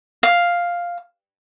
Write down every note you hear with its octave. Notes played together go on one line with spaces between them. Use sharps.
F5